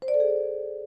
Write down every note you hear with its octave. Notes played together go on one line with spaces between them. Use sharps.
C5
D5
A4
G#4